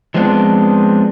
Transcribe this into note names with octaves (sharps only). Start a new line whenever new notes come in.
F3 G#3 B3 C4 D4